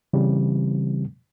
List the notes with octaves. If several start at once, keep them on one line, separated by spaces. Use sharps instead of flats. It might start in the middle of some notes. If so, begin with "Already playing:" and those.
C#3 E3 G3 C4